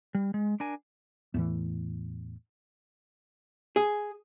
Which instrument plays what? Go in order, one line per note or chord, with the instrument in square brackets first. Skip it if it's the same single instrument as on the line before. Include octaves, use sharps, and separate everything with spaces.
[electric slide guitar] G3
G#3
D4 A#4 G#5
[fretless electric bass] E2 A2 E3
[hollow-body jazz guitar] G#4